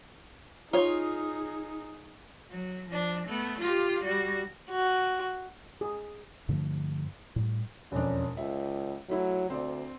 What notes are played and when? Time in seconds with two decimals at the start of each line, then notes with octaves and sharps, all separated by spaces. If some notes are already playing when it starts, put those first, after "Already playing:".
0.73 D#4 F4 G#4 C#5
2.51 F#3
2.89 F3 D4
3.27 A3 B3
3.61 F4 G4
4.04 G3 F#4
4.71 F#4
5.81 G#4
6.49 G2 D3 F3 A3
7.36 A2 G3
7.92 E1 F2 C#4 D4
8.37 C#2 E5
9.09 F#3 A3 E4
9.50 D2 C4 D5